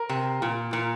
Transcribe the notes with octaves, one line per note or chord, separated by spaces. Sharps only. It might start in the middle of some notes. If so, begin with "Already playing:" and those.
Already playing: A#4
C3
A#2
A#2